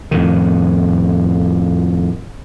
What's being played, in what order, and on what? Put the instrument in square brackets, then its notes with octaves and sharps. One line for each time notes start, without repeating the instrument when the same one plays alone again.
[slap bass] F2 A2 D#3